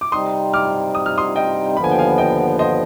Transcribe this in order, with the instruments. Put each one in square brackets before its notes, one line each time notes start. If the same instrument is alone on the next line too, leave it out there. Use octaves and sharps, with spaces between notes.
[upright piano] D6
[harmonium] C3 G3 C4 D#4 [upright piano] C6 D#6
[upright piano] D6 F6
D#6
F6
C6 D#6
D#5 G5
[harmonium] D#2 D3 F3 B3 [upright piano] B5
[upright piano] G#5
G5
F5 G#5
D#5 G5
C5 D#5